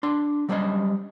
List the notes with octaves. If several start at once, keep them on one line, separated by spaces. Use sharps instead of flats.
D4 C6
F#3 G3 C#4 C5 C#5 D#5